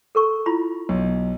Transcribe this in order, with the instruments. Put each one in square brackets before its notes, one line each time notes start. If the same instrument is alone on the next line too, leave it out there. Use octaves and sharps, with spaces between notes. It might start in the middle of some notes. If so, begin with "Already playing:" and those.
[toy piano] A4 A#4 C#6
E4 F4 B5
[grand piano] B1